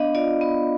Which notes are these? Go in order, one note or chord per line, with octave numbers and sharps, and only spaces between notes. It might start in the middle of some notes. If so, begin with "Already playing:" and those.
Already playing: B3 D4 D#5 F5
F4 D5
B3